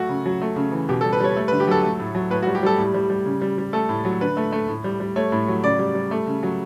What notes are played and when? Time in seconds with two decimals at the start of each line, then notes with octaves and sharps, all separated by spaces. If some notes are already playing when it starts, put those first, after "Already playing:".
Already playing: F#3 A3 F#4
0.09 C#3
0.26 F#3
0.41 A3
0.56 C#3
0.72 E3
0.89 B2 G4
1.01 A4
1.05 G3
1.13 B4
1.20 G3 C#5
1.36 A3
1.48 B4
1.52 D3
1.60 G4
1.68 F#3 A4
1.83 A3
2.00 A2
2.15 F#3
2.30 A2 B4
2.43 F#4
2.47 G3
2.55 G4
2.63 G3 A4
2.78 A2
2.94 G3
3.10 G3
3.26 C#3
3.42 G3
3.58 G3
3.73 A3 A4
3.89 A2
4.05 F#3
4.21 D3 B4
4.37 A3
4.52 A3
4.68 A2
4.84 G3
5.00 G3
5.16 A3 C#5
5.32 A2
5.48 F#3
5.63 C#3 D5
5.79 G3
5.95 G3
6.11 A3
6.27 C#3
6.43 F#3